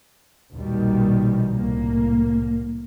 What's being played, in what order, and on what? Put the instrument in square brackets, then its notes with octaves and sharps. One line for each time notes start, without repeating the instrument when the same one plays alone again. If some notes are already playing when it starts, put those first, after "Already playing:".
[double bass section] A#1 D#2 B2 D#3 G3
C2 A2 A#3